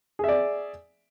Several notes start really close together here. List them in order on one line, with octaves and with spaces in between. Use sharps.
G#4 E5 D5